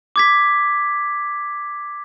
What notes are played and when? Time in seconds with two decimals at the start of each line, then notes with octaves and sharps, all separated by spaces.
0.16 D6 G#6 B6